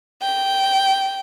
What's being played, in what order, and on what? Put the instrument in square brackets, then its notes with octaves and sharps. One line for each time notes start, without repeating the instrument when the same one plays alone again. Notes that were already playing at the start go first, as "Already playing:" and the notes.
[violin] G5